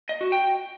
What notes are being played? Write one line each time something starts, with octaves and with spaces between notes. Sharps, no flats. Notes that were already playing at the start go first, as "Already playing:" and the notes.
D#5
F#4
G5